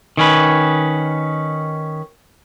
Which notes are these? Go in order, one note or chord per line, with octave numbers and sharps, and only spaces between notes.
D#3 C#4 B4